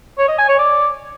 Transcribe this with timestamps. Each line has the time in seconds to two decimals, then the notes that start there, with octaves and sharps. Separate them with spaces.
0.18 C#5
0.28 D#5
0.38 G#5
0.48 C#5
0.59 D5